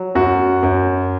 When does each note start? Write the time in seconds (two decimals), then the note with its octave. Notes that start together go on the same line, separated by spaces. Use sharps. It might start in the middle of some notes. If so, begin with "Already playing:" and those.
Already playing: F#3
0.15 F#2 F#4
0.63 F#2